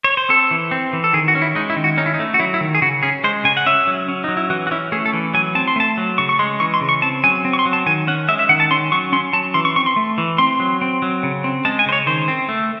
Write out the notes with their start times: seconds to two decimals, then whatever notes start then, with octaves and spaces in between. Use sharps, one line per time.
0.04 C#5
0.17 C5
0.29 C4 A4
0.51 E3
0.71 C4
0.93 E3
1.04 A4
1.13 D#3 G#4
1.28 F#4
1.35 C#4
1.42 E4
1.55 G#3 D#4
1.70 E4
1.76 D#3
1.84 F#4
1.98 C#4 D#4
2.06 E4
2.14 D#4
2.19 A3
2.34 F#4
2.40 F#3 E4
2.54 E4
2.61 D#3
2.75 G#4
2.82 C#3 F#4
3.03 C#4 G#4
3.24 G#3 C5
3.44 C#3 G#5
3.57 F#5
3.66 C#4 E5
3.87 F#3
4.08 C#4
4.24 F#3 D#4
4.37 E4
4.50 E3 F#4
4.67 F#4
4.71 C#4 E4
4.92 A3 G#4
5.06 A4
5.13 E3
5.34 F#3 G#5
5.55 C4 A5
5.68 C6
5.76 A3 A5
5.97 F#3
6.18 C#3 C#6
6.29 C#6
6.39 G#3 C6
6.60 E3 C#6
6.74 C6
6.81 C#3
6.89 C#6
7.02 C4 A5
7.24 F#3 G#5
7.45 C4
7.53 C#6
7.59 C6
7.66 F#3
7.73 A5
7.86 D#3 G#5
8.07 C#4 F#5
8.28 G#3 E5
8.39 E5
8.49 D#3 F#5
8.60 A5
8.71 C#4 C6
8.92 F#3 C#6
9.12 C#4 C6
9.33 F#3 A5
9.54 E3 C6
9.65 C#6
9.76 C4 C#6
9.86 C6
9.96 A3
10.18 E3
10.38 C4 C6
10.60 F#3
10.81 C4
11.02 F#3
11.23 C#3
11.44 C4
11.65 G#3 A5
11.79 G#5
11.86 C#3 C5
11.92 C#5
12.06 D#3 C5
12.28 C4
12.49 A3